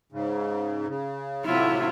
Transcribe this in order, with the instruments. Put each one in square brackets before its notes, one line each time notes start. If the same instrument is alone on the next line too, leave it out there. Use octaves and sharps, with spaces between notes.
[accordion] G#2 C#3
C#3
[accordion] A2 C3 F#3 [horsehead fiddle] E4 F4